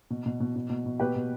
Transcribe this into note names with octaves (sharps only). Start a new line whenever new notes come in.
B2
B2
B2
B2
B2
B2
B2 G4 B4
B2